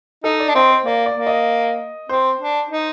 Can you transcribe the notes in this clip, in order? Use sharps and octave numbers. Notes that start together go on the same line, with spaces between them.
D#4 A4
D5
D4
C4 D#5
C5
A#3 D5
D5
A#3
D#5
C4 C5
D4
D#4